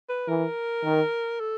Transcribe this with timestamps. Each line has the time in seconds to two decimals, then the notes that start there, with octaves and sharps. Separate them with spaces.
0.09 B4
0.28 E3 A#4
0.84 D#3
1.40 A4